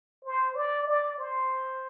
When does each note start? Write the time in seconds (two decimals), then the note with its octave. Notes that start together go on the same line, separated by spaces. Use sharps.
0.25 C5
0.56 D5
0.87 D5
1.19 C5